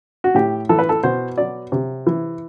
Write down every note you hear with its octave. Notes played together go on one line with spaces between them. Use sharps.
F#4
A2 G4
E3 A4
B4
A4
B2 C5
F#3 D5
C3
E3